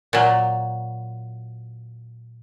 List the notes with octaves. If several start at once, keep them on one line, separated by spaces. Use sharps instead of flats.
A#2 F#3